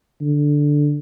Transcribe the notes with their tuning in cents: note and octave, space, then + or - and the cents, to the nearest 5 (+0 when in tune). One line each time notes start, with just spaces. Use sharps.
D3 +0